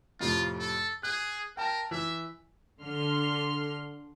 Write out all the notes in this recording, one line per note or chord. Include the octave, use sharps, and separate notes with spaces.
F2 A2 C3 F4
A4
G#4 F#6
A#4 G5 A5
E3 E5
D3 C6 F6